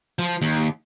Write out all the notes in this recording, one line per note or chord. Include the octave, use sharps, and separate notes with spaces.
F3
D#2